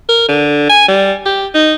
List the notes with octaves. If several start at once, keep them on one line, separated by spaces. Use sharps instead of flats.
A#4
D3
G#5
G3
G4
D#4